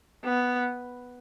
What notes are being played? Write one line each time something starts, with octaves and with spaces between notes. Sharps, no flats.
B3